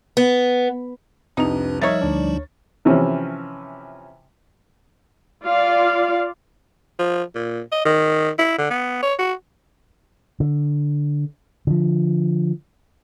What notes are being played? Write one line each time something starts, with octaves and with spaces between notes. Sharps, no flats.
B3
C2 F2 D4 D#4 B4 F7
F3 G3 D#4 A#4 C#5 D#5 E5 A6
D2 D4 D5
C3 E3 F3 C#4
F4 D5 F5
F3
A#2
D#5
D#3
E4
D3
B3
C#5
F#4
D3
D3 F3